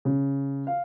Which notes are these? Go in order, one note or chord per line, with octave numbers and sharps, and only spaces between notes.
C#3
F5